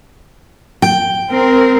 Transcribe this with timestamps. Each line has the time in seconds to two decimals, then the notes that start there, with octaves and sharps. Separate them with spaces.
0.82 G5
1.31 C4 A#4